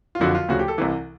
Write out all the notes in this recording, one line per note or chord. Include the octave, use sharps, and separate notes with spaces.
F4
F#1 F2 D3 F3 F#4
F4
D2 C#3 F3 F#4
G4
A4
C2 C3 E3